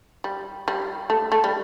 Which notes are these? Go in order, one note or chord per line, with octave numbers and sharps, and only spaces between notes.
G3
G3
A3
A3
G3